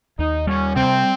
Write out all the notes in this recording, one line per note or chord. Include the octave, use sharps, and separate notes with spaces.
D#2 D#4
G3 C#4
C3 C4